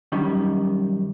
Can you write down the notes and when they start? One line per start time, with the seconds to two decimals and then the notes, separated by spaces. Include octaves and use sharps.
0.12 F#2 D#3 G3